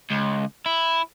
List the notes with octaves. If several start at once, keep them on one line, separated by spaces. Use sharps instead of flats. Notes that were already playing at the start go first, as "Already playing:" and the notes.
C#2
E4